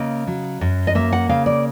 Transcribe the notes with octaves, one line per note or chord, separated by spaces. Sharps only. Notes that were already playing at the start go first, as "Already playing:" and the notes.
Already playing: C#3 A#3 D#5
F#3
F#2
D#5
A#3 E5
F#5
C#3 F5
D5